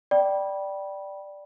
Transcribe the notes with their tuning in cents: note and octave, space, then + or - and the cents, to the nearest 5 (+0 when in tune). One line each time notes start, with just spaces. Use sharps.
D5 +0 G5 -15 B5 -20